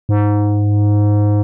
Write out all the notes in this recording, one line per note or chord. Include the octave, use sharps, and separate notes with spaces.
G#2